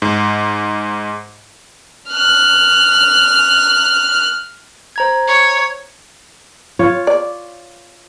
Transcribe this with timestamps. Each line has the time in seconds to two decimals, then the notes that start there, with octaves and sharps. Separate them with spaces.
0.02 G#2
2.10 F6 F#6
4.96 C5 A#5 G#6
5.28 C#5
6.79 F4 C#5
7.07 D5